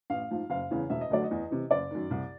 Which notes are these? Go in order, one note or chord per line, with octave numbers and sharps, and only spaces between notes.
A1 F5
G#2 F3
F#1 F5
E2 C#3 E3
E1 E5
D#5
D2 D3 F#3 D5
D#5
E2
C3 E3
F#1 D5
F#2 D#3
C2